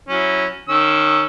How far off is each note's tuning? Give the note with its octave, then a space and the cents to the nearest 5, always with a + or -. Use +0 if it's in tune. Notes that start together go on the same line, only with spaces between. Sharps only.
F#3 -10 C#4 -5 E4 -10
D#3 -20 C#4 +0 E6 +0